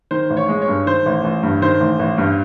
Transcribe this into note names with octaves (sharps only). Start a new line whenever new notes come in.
D#3 C5
A1
C#5
G#3
C#5
G2
D#3 C5
A1
A1
G2
D#3 C5
A1
A1
G2